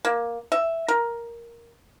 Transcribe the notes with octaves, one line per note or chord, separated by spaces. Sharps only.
A#3
E5
A#4